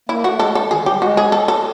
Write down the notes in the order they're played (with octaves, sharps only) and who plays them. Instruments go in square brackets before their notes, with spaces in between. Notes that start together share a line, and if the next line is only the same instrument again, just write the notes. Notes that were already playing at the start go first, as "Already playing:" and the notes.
[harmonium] A#3 [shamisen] E4
[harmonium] A3 [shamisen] F#4
[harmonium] G#3 [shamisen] A4
[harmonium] A3
[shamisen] A4
[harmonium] D#3 [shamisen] G#4
[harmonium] D3
[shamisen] G4
[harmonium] G3
[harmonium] G#3 [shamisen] F#4
[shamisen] G#4
A4
A4